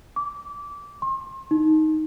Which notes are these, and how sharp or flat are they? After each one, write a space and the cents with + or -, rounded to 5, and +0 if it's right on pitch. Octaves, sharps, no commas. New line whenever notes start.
D6 -20
C6 +35
D#4 +5